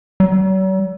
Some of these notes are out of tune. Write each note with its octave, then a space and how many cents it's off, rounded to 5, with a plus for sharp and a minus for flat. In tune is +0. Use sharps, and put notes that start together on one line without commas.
F#3 +45